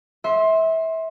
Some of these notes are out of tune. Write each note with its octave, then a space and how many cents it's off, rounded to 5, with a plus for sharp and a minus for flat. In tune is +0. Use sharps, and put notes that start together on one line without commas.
E5 -25 C6 +15